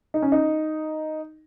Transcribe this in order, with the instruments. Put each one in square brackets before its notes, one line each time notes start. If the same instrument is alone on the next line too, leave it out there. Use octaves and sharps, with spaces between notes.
[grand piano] D#4
C#4
D#4